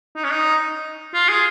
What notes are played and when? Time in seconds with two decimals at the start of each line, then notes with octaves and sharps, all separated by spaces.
0.16 D#4
0.24 C#4
0.31 D#4
1.14 F4
1.29 G#4